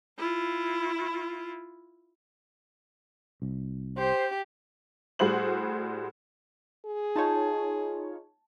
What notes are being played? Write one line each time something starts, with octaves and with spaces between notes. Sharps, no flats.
E4 F4
C2
G4 C5
A2 G3 F#4 G#4 C5 F#7
G#4
D#4 F4 C#5 A5 G6